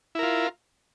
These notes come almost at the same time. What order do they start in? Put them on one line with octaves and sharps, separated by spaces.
E4 A#4 F4